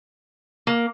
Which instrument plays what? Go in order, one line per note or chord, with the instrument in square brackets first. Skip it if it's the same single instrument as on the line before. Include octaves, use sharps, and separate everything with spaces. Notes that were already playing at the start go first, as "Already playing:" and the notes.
[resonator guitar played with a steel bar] A#3